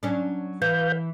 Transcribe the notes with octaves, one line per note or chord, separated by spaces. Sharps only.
F#3 C#4 D4
E3 B4 F5 G6